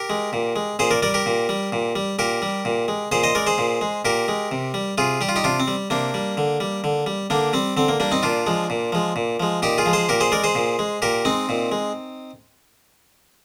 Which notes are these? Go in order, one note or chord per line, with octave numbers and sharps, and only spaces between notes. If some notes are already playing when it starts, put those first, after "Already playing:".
Already playing: G4 A#4
G#3
A#2
G#3
A#2 G#4 C5
A#4 D5
G3 A#4 D5
G4 A#4
A#2
G3
A#2
G3
A#2 G4 A#4
G3
A#2
G#3
A#2 G#4 C5
C5 D#5
G#3 A#4 D5
G#4 C5
A#2
G#3
A#2 G4 A#4
G#3
C3
G3
C3 F4 G#4
G3 G4
F4
D#4 G4
C3 D4 F4
C4
G3
C3 A#3 D4
G3
D3
G3
D3
G3
D3 A#3 D4
G3 C4
D3 C4
A#3
G3 A#3 D4
C4 D#4
A#2 D4 F4
F3 G#3
A#2
F3 G#3
A#2
F3 G#3
A#2 D#4 G4
F4 G#4
F3 G#3
G#4 C5
A#2 G4 A#4
G#4 C5
G#3 A#4 D5
G#4 C5
A#2
G#3
A#2 G4 A#4
G#3 C4 D#4
A#2
G#3